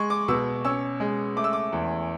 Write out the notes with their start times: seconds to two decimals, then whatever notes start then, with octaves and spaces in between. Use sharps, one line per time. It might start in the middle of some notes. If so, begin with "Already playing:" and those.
Already playing: G#3 C#6
0.10 D6
0.28 B2 E6
0.65 C#4 E6
1.00 G#3
1.36 A3 D6
1.44 E6
1.53 D6
1.73 E2